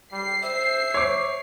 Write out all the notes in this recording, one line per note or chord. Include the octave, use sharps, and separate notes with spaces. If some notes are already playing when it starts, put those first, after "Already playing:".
G3 C7
C5 E5
C#5 C#6 D6